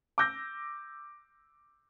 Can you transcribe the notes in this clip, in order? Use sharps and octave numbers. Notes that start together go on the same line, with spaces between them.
D6 E6 G6 A#6